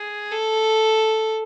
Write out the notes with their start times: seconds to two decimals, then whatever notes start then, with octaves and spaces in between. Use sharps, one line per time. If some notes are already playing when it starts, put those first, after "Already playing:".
Already playing: G#4
0.31 A4